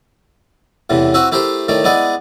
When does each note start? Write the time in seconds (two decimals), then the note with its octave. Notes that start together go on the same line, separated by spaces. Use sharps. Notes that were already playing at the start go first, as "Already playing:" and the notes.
0.90 E2 A2 C3 E3
1.14 C4 E4 F#4 B4 E5
1.32 A3 E4 G4 A#4 C5
1.68 A2 D#3 A3 D5
1.84 G#3 B3 E4 D5 D#5